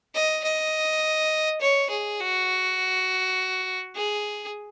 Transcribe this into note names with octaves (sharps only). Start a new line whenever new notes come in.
D#5
D#5
C#5
G#4
F#4
G#4